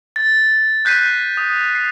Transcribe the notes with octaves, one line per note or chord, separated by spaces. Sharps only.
A6
F#6 G6 B6 C7 D#7
D#6
C7